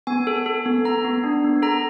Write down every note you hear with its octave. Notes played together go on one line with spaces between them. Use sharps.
B3 G#5
A4
A4
B3
B3 A#5
B3
D4
B3
A4 A#5